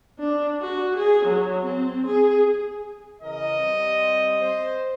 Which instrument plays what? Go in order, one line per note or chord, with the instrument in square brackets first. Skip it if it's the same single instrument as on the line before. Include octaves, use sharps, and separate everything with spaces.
[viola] D4
F#4
G#4
F#3
C4
G#4
[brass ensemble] C#3 E3 A#4 [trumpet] D#5
[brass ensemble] G3 C4
C5